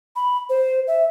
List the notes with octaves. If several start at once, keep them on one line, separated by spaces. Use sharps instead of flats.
B5
C5
E5